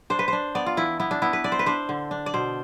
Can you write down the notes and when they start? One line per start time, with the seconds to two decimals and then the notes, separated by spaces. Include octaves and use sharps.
0.10 D4 C5
0.19 B4
0.28 D4 C5
0.55 B3 D5
0.66 F4
0.77 E3 E4
1.00 B3 E4
1.11 D4
1.22 B3 E4
1.33 B4
1.44 D4 D5
1.52 C5
1.59 B4
1.66 D4 C5
1.89 D3
2.11 D4
2.26 D5
2.34 B2 C5